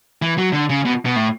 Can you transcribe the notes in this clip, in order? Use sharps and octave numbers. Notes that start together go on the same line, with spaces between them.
E3
F#3
D3
C#3
B2
B2
A2